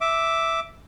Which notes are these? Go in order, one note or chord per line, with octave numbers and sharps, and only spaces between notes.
E5 D6